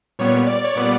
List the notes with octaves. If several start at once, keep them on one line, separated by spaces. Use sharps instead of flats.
A#2 G3 B3 C#5
D5
C#5
A#2 G3 B3 D5